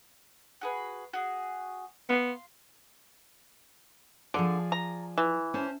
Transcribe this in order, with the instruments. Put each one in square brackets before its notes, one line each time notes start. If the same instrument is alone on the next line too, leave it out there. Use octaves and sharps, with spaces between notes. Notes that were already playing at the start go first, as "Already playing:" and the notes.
[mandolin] F#4 G#4 B4
F#4 G#4
[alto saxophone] B3 [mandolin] F5 C6
[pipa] D3 [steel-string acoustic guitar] F3 G#4 D5
[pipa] A#5
E3
[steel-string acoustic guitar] C#4 C5 A5